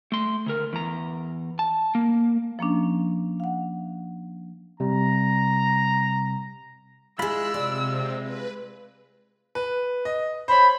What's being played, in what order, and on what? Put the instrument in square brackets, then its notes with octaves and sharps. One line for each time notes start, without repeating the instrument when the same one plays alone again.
[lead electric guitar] A3 C6
D2 A#4
E2 A#5
A5
A#3
[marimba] F3 A#3 C#4 D4
F5 F#5
[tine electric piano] C3 G3 [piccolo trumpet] A#5
[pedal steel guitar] G#3 F4 B5 [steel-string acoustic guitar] E4 G#4 [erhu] E6 [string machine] F#6
[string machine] C3 [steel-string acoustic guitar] D5
[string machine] B4
[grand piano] B4
D#5
[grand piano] C5 C#5 [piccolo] B5